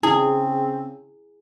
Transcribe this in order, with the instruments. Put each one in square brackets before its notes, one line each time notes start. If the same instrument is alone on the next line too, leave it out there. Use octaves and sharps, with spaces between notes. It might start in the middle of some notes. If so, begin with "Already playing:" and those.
[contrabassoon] C#3 [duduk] C4 [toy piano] E4 [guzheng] G#4